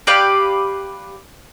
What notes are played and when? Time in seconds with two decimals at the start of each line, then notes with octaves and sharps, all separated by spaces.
0.07 G4 B4 D5 F5